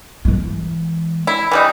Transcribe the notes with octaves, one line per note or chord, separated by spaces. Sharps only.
E3 G#3
E4
E3 G3 D#4